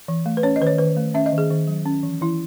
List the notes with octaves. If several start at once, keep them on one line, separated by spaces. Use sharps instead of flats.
E3
A3
B4
C#4 C#5
D#5
D#3 B4
C#5
D#3 B4
A3
C#4 E5
D#5
D#3
G#4
D#3
F#3
C#4
E3
E3 E4